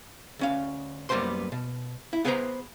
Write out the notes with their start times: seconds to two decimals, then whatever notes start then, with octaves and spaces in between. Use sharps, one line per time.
0.39 D2 C#4 F5
1.09 F#2 G3 A#3 B3 C5 C6
1.52 B2
2.13 E4
2.25 B3 G#4 B4 C5 F#5 A#5